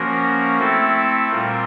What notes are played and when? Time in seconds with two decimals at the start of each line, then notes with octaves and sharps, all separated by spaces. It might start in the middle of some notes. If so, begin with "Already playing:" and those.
Already playing: F3 A#3 C#4 F#4 A#4
0.59 A3 C4 E4 A4
1.29 A#2 G3 C4 F4 A#4